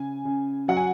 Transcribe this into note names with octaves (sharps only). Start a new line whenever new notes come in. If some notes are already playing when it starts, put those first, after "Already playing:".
Already playing: C#3 G#5
C#3
F#3 F#5
G#5